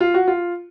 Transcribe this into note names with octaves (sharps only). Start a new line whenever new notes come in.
F4
F#4
F4